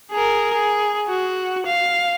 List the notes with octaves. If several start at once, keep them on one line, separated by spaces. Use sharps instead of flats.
G#4 A#4
G#4
F#4
F5